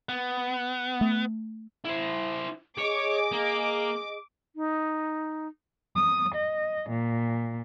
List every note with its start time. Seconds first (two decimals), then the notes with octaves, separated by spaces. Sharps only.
0.09 B3
1.01 A3
1.85 E4 C5
2.78 G#4 C#5 D#5 D6
3.32 A#3
4.56 D#4
5.95 D#6
6.34 D#5
6.90 A#2